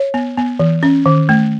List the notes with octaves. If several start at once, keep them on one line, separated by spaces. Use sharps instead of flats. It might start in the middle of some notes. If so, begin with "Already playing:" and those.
Already playing: C#5
B3
B3
E3
C#4
D#3
A3